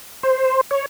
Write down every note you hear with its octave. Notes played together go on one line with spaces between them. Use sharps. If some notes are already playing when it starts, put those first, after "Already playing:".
C5
C#5